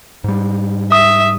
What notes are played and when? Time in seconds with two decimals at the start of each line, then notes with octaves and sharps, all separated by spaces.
0.24 G#2 G3
0.92 E5 D#6